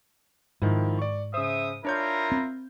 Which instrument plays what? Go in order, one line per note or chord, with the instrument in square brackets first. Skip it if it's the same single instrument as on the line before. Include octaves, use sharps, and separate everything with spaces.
[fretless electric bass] G#2 [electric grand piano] D#3 F3 E4
[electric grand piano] D5 C#6
[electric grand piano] C#3 C5 [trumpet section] E5 D#6
[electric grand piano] D4 C#5 G6 [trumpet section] E4 F4 A#4
[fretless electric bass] C4